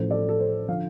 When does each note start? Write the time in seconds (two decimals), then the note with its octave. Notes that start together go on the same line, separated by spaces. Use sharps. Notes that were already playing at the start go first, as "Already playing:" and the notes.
Already playing: A1 A2 F3 C5
0.11 A4 D5
0.29 A4
0.40 C5
0.68 D3 F3 F5